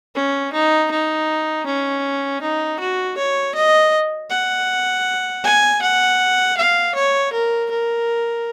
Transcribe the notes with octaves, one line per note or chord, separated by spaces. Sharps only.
C#4
D#4
D#4
C#4
D#4
F#4
C#5
D#5
F#5
G#5
F#5
F5
C#5
A#4
A#4